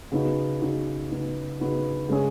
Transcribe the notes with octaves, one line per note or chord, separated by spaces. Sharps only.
C#3 B3 D#4 F#4
C#3 B3 D#4 F#4
C#3 B3 D#4 F#4
C#3 B3 D#4 F#4
C#3 G#3 C#4 G#4